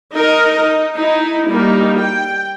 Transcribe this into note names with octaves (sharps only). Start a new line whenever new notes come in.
D#4 A#4 D#5
D#4
D#4 E4
G3 A#3 D#4
G5